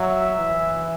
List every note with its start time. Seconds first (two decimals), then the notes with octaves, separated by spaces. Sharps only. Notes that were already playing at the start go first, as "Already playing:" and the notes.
Already playing: F#3 E5
0.39 E3